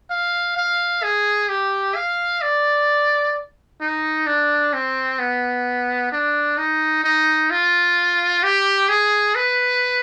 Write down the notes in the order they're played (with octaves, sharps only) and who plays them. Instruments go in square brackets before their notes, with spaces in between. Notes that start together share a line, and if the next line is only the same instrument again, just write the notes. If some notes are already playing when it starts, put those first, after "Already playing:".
[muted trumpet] F5
F5
G#4
G4
F5
D5
D#4
D4
C4
B3
D4
D#4
D#4
F4
G4
G#4
B4